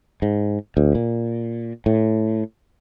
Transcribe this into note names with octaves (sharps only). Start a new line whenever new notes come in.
G#2
D2
A#2
A2